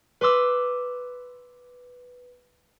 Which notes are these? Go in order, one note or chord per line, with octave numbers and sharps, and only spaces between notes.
B4 C6 D6 E6